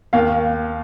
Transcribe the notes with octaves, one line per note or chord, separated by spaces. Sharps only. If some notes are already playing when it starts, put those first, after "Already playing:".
D#2 F5